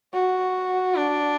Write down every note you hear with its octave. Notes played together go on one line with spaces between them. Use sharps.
F#4
D4